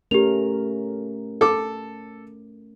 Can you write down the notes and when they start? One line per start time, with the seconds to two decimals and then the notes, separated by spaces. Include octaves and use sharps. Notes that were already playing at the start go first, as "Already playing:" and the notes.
0.11 A3 C#4 G4 A#4 F7
1.41 A4 D6